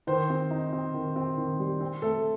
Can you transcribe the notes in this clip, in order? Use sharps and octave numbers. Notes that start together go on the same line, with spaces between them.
D#3 C5
C4
D#4
C4
D#3
C4
D#3
G3
C4
A3 A4